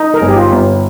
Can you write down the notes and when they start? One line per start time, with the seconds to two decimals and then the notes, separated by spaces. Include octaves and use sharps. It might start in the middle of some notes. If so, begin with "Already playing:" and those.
Already playing: D#4
0.14 A#4
0.21 G1 G#4
0.29 G4
0.36 F4
0.52 G1